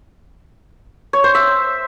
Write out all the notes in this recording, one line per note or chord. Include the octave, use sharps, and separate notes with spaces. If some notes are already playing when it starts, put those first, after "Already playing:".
C#5
C5
E5